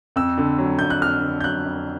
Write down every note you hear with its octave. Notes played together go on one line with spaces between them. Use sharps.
F2 E6
D3
F#3
F2 G6
F#6
F2 F6
D3
G6
F#3 F#6
F2